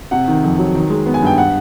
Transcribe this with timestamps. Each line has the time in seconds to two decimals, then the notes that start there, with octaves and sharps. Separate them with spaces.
0.11 C3 F#5
0.28 D#3
0.44 F2
0.58 F#3
0.75 D#3
0.90 G#3
1.06 B3
1.14 G#5
1.22 G2 G5
1.38 F#5